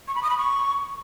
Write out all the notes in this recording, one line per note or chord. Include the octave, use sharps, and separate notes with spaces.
C#6
B5
D#6
B5
C#6